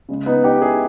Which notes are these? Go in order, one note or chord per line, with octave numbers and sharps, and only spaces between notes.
C#3 G#3
B3 D#4
D#4 G4
E4 G#4